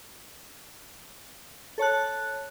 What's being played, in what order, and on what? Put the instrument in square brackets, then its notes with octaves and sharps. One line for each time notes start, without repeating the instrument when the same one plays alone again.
[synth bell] A4 C#5 A5 F#6